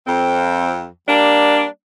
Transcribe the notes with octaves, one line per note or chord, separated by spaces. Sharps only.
F2 C4
G3 A#3 D4